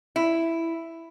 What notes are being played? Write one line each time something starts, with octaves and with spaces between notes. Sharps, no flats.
E4